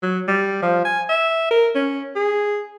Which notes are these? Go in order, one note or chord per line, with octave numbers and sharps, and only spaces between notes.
F#3
G3
F3
G#5
E5
A#4
C#4
G#4